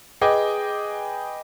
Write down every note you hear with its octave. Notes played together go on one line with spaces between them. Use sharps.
G#4 B4 D#5 G5 G#5 D6